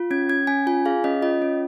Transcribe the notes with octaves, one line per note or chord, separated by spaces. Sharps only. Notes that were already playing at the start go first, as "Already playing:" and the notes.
Already playing: F4
C#4 G#6
C#4 G#6
C#4 G#5
F4 G#5
G#4 F5
C#4 D#5
F4 D#5
C#4